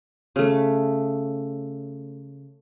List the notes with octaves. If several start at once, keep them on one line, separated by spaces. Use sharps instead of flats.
C#3 A3